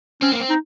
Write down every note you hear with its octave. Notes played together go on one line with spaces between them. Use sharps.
C4 C#4
A#3
C4
D#4